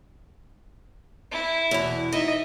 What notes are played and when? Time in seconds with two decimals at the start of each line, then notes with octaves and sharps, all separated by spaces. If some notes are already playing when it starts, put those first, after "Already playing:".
1.31 E4
1.71 E2 B2
2.12 D#4 D#5 E5